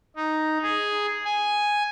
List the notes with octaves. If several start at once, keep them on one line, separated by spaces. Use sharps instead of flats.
D#4
G#4
G#5